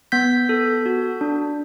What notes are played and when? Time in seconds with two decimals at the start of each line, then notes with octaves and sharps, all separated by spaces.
0.12 B3 G6 B6
0.49 A4
0.86 F#4
1.21 D4